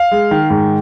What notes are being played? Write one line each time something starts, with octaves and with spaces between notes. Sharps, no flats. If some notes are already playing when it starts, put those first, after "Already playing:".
Already playing: F5
G#3
D#3
G#2